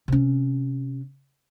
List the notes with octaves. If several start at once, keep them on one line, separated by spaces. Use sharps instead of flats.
C3 C#4